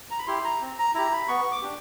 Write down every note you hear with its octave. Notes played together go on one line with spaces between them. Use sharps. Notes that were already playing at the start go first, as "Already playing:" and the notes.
A#5
B5
E4 G4 C6
A#5
C4
A#5
E4 G4 A#5
B5
B3 C#6
D6
D4 G4